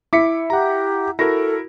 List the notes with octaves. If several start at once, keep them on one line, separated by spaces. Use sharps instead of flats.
E4 D6 B6 C#7
G4 F#5 A#5
E4 F#4 A4 A#4 A#6